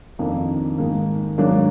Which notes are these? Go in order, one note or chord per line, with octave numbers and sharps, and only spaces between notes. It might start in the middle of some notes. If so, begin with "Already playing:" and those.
F2 D#3 A#3 D4
G#2 D#3 A#3
G#2 D#3 F#3 A#3 D4